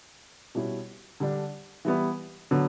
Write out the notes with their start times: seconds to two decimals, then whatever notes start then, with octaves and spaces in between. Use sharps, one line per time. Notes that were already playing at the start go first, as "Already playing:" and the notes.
0.55 B2 G3 C#4 E4
1.20 D3 G3 D4
1.85 E3 G3 B3 E4
2.51 D3 F#3 B3